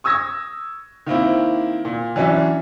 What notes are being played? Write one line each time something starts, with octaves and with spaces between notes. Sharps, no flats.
C#6 D#6 E6 G#6 A#6
D#3 A#3 C4 E4
A#2
E3 F#3 C#4 D4 E5